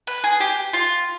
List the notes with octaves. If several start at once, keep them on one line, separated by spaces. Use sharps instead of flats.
B4
G#4
G4
F4